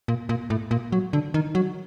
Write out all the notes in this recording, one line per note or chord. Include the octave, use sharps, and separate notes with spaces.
A#2
A#2
A2
A#2
F#3
D3
D#3
F#3